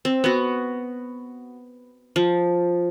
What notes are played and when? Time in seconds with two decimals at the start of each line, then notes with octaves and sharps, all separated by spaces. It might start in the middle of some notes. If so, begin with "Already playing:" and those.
0.05 C4
0.24 B3 F#4
2.16 F3